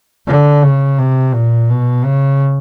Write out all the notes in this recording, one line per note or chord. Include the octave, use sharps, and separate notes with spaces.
D3
C#3
C3
A#2
B2
C#3